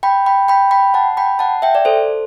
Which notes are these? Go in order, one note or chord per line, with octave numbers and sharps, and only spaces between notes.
G5 B5
G5 B5
G5 B5
G5 B5
F#5 A5
G5 B5
F#5 A5
E5 G5
D5
A4 C5